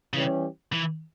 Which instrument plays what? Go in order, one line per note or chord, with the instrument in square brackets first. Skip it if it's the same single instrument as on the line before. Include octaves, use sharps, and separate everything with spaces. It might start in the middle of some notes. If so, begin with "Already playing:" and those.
[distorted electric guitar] C#3 [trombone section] E3 G3 C#4 G4
[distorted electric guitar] E3